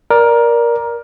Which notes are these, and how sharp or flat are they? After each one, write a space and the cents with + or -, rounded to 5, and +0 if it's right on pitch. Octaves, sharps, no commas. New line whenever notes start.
A#4 +15 D5 +0